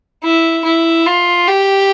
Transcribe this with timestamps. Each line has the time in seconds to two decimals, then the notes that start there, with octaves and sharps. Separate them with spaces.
0.23 E4
0.64 E4
1.06 F4
1.48 G4